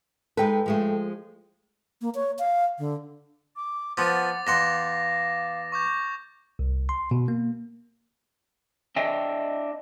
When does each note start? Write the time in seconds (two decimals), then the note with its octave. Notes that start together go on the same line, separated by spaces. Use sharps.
0.37 G#3 D#4 A4 B4 G5
0.66 F3 G#3 A3
2.02 A#3
2.15 C#5
2.39 F5
2.79 D3
3.56 D6
3.97 F3 B3 F#5 D6 A6
4.47 E2 F5 F#5 C6 A#6 E7
5.72 C#6 D6 G6
6.59 C2
6.89 C6
7.11 B2
7.28 A#3
8.96 D4 D#5 E5 G5